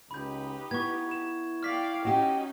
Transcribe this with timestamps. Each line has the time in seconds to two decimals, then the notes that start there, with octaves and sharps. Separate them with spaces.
0.11 C#2 D#4 G4 B4 B5 G6
0.71 B3 E4 C#6 G#6
1.11 E7
1.63 D5 F5 G5 F6 B6
2.05 C#4 D#4 F#4 G4